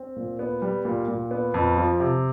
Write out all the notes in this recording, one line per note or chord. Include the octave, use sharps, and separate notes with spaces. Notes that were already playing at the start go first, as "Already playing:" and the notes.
Already playing: C4
A#2
B3
G3
A#2
A#2
B3
F2
F3
C3